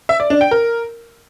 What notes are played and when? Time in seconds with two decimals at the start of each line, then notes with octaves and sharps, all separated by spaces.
0.09 E5
0.20 D5
0.30 D4
0.41 G5
0.51 A#4